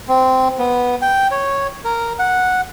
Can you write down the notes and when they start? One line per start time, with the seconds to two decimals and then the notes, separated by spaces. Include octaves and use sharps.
0.09 C4
0.59 B3
1.02 G5
1.31 C#5
1.85 A#4
2.19 F#5